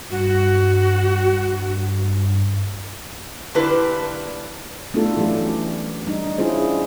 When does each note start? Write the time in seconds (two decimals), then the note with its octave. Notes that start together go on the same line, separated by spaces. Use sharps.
0.11 G2 F#4
3.54 D3 A#3 D4 E4 G4 B4
4.94 A3 B3 D4 E4 F4 A4
5.17 E3 F#3 A3 C#4 G4
6.07 G3 D4 D#4
6.38 C#4 D4 E4 F4 G#4 C5